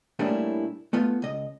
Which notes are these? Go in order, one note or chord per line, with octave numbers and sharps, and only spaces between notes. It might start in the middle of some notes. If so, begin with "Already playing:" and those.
A2 G3 A#3 C#4 D4 E4
A3 B3 F4 B4
C#2 D#5